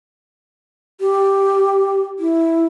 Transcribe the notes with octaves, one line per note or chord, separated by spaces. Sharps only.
G4
E4